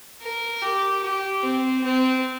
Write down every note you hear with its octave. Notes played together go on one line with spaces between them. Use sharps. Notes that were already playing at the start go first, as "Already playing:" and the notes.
A#4
G4
G4
C4
C4